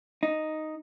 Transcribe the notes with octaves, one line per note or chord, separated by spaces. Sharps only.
D#4